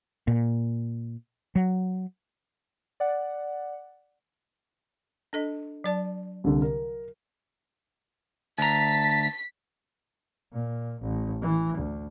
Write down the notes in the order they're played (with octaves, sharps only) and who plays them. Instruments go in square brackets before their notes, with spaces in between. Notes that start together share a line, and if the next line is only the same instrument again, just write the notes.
[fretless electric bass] A#2
F#3
[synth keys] D5 F#5
[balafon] D4 A4 D#5
F#3 D5 A5
[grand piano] C2 D3
A#4
[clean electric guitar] D2 A#5 [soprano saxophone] A5 [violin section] B6
[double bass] A#2
A1
E3
D2